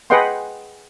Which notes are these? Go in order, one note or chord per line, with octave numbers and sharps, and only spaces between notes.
G#4 B4 D#5 F#5 G5 C6